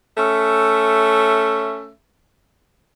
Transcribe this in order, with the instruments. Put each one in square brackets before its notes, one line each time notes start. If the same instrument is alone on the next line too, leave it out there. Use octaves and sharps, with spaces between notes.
[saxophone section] A3 C#4 E5